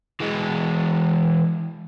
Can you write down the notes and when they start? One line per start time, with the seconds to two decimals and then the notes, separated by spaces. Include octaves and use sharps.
0.20 E3 G#3